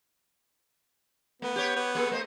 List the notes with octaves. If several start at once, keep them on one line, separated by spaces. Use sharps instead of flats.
A3 B3
G4 C#5
B3
A#3 G#4 A4
A3 C5 D#5